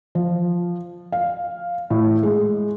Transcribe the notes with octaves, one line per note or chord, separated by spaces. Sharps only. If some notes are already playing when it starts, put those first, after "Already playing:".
F3
F5
A2
G#3